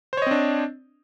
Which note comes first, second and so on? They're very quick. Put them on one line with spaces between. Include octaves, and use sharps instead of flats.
C5 C#5 D#5 C4 D4